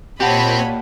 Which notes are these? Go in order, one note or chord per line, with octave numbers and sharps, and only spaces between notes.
A#2 C4 G4 C#5 D#5 F#5 A5 B5